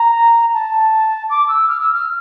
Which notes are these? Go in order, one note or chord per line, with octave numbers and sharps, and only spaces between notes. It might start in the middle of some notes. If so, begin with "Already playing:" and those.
Already playing: A#5
A5
D6
E6
F6
E6
F6